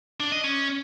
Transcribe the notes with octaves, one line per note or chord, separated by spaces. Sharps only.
D4
D#5
C#4